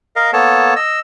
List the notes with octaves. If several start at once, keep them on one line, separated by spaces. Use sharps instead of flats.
A#4 D#5 F5
A#3 B3 A4 C#5 A5
D#5 E6